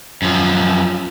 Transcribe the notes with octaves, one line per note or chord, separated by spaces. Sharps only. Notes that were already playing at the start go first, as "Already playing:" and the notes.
F#2 F3